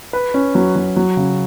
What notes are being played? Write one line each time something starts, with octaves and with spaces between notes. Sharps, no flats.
B4
C#4
F#3
F#3
F#3
C#3